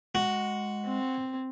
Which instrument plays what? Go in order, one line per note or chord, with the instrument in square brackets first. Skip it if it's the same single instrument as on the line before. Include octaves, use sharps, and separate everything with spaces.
[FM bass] G#3 [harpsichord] F#4
[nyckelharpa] C4